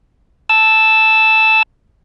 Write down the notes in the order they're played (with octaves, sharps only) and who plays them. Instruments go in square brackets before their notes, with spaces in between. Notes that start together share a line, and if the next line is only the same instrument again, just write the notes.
[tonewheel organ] A5 E6